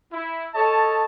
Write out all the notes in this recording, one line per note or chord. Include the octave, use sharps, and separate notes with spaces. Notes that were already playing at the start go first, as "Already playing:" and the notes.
E4
A4 C#5 D#5 A5